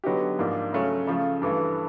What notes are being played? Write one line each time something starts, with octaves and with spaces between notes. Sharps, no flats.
D3 F#3 B3 D#4 G4
G#2 F3 A#3 D4
C#3 F#3 A3 C#4
C#3 F3 A3
G2 E3 A3